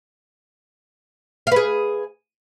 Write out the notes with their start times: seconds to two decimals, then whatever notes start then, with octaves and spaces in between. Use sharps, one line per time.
1.47 F5
1.52 B4
1.56 G#4